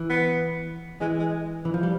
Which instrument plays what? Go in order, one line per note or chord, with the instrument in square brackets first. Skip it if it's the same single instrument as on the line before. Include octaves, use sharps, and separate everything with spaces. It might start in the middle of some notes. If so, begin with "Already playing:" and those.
Already playing: [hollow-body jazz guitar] E3
[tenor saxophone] B3
[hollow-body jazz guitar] E3 [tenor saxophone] G#3
[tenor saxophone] G#3
[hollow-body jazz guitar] E3
F3
G3